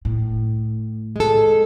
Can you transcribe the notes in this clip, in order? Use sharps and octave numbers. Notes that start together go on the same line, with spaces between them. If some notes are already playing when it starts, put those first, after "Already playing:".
A2
G#3 A4